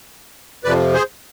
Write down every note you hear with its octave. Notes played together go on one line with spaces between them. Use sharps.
F2 C3 F3 B4 D5
G#4 C5